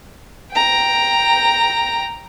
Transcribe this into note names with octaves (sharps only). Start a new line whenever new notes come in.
G5 A#5